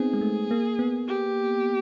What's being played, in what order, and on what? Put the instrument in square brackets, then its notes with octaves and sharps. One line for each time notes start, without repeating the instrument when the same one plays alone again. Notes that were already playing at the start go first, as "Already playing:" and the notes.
Already playing: [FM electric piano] B3 C4 D#4 [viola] G#4
[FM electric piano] G#3
A3
A#3
B3
[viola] G4